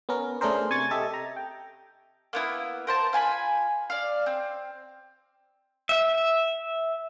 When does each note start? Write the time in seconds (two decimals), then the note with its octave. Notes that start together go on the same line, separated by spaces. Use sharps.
0.09 B3 C#4 A#4
0.41 A3 C#4 D4 G#4 A#4 C5
0.70 C3 G#5 C#6 A6
0.91 G4 A4 D#5 E5 A5
1.14 A#5
1.36 G5
2.33 A#3 B3 E4
2.87 A#4 C5 A5
3.13 F4 G#5 A5 B5
3.90 D5 F5
4.26 C4
5.89 E5